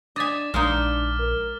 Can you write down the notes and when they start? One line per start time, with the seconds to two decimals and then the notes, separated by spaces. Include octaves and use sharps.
0.16 D4 D#5 G#5 D6 A6 B6
0.54 A#1 G#3 A#3 D4 D#4 F6
1.19 A#4